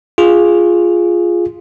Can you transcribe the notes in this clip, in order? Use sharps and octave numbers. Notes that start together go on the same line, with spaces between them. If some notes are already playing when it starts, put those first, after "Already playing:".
F4 G#4